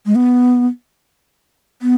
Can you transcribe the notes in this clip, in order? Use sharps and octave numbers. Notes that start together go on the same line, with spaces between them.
G#3
B3
B3